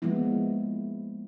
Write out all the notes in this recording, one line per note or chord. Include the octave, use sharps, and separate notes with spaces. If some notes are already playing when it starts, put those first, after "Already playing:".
F3 G#3 A#3 B3 E4